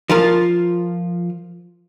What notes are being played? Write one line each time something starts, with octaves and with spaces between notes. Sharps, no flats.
F3 F4 A#4